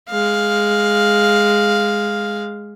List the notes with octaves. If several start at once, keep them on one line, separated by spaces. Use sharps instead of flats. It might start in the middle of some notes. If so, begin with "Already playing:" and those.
G#3 F5